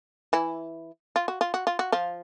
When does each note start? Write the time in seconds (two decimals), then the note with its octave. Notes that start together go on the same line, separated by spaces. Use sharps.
0.33 E3 E4
1.16 F4
1.28 F#4
1.41 F4
1.54 F#4
1.67 F4
1.79 F#4
1.92 F3 F4